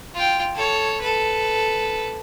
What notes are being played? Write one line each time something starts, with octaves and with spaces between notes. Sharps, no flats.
F4 G5
A4 C#5
A4 B4